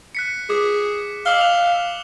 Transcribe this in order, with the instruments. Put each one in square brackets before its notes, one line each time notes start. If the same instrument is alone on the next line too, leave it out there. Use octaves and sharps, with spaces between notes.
[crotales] F#6 B6 C#7
[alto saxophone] G#4 [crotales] D6
[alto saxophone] F5 [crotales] D6 E6 G7
[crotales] F7